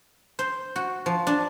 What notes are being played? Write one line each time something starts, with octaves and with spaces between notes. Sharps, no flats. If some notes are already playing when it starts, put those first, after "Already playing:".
C5
F#4
F3
D4